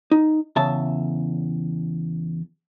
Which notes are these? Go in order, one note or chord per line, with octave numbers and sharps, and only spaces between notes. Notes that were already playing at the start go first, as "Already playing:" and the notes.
D#4
E2 C#3 E5 A5